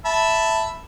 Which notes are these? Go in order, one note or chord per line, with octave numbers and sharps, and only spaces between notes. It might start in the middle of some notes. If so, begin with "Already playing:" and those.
E5 A5 B5